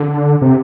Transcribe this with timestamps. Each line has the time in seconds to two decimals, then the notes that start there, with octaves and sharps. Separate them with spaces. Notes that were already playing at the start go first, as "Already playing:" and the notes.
Already playing: D3
0.42 C3